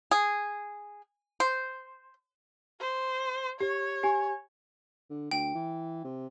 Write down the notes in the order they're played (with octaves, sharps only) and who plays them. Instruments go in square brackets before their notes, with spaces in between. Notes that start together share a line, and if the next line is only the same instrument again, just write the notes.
[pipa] G#4
C5
[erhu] C5
[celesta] G4 [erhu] C#5
[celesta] G4 G#5
[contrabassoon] D3
[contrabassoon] D2 [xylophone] G5
[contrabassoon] E3
C3